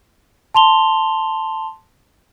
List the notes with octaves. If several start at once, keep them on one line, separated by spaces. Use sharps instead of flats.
A5 C6 F7 G7